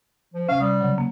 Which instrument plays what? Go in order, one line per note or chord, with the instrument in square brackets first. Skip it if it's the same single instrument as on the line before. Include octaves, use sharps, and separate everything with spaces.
[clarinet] F3
[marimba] C3 C#4 [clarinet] F5
[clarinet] G3 [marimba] D#6
[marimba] C#3 F#3
A#3